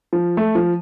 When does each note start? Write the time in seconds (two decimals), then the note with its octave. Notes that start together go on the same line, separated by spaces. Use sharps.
0.13 F3
0.37 A3
0.55 F3